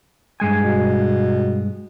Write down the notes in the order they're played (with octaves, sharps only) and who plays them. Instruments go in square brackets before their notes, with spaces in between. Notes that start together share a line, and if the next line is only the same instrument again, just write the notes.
[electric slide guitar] G2 G#3 G#5
[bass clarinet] B2